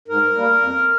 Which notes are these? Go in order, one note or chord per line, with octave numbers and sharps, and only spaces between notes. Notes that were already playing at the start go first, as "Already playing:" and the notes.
G#2 A#4
G3 A#3
F2